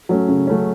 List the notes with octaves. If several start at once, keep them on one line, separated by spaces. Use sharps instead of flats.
F#3 A3 C#4
C#3
F#3 A3 C#4